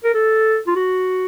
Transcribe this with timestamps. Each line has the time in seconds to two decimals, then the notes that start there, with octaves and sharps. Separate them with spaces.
0.04 A#4
0.14 A4
0.67 F4
0.76 F#4